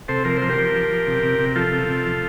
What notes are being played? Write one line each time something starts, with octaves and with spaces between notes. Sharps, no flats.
C3 A4 C5
F3 A#4
F3 C5
G4 A#4
F3
F3
F3
C3
C3
C3
F3 F4 A4
C3
C3
F3